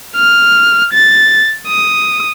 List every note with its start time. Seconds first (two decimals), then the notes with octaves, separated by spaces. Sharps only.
0.16 F6
0.94 A6
1.67 D#6